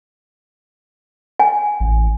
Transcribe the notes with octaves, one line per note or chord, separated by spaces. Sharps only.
G#5
A1